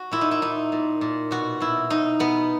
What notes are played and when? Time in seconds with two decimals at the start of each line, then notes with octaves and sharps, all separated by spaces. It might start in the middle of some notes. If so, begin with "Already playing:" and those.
Already playing: F#4
0.11 A#2 E4
0.21 D#4
0.31 E4
0.42 A#2 D#4
0.72 A#2
1.01 A#2
1.31 B2 F#4
1.60 B2 E4
1.90 B2 D#4
2.19 B2 B3